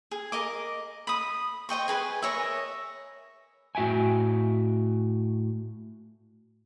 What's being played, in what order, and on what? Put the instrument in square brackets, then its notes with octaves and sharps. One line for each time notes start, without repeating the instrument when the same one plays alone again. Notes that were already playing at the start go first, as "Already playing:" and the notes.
[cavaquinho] G#4
A#4 D#5 D6
B5 D#6
C5 D#5 G5 C#6
G#4 B4 G#5
A#4 C#5 D#5 E5
[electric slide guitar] A2 F#4 E5 G5 G#5